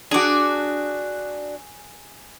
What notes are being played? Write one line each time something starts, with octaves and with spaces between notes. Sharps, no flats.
D4 F#4 G#4 D6